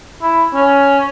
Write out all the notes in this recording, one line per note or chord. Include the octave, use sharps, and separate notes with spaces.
E4
C#4